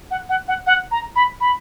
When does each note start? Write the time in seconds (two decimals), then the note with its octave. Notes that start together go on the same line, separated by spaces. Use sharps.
0.11 F#5
0.29 F#5
0.48 F#5
0.67 F#5
0.91 A#5
1.16 B5
1.41 B5